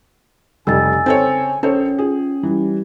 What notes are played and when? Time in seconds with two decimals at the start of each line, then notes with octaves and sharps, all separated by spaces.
0.67 F1 C#3 G3 G#5 E6 A6
1.06 C4 A4 C#5
1.63 A#1 C#4 A4 C5 C#5
1.98 F4 G#4
2.43 E3 G3